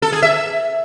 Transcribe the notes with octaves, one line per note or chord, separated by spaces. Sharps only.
A4
G#4
E5